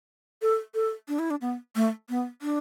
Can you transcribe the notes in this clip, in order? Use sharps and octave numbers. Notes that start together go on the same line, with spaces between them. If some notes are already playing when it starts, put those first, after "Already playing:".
A4
A4
D4
E4
D4
B3
A3
B3
D4